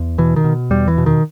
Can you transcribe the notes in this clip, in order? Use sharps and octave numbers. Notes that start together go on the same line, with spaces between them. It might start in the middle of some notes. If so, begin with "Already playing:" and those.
Already playing: E2
B2 E3
D#3
B2
E2 G3
E3
B2
D#3